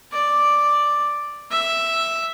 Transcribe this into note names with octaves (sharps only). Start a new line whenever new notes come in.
D5
E5